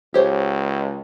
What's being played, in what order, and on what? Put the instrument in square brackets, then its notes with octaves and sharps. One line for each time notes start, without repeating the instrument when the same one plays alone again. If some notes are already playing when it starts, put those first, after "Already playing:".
[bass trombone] C#2 [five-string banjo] G4 C5 C#5